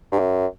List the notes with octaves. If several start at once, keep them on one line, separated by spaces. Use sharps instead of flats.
G2
F#2